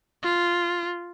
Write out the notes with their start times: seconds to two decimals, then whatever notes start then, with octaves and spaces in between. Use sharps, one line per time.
0.23 F4